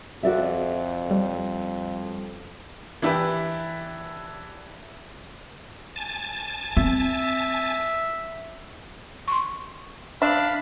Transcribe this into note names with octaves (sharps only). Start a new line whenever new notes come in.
F2 F#4 D5 E5
G3
E3 D4 E4 G4 B4
G#5 A5 A6
C4 E5
C6 C#6
D4 E5 F5 B5